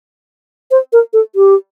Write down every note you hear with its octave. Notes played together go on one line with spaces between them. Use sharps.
C5
A#4
A4
G4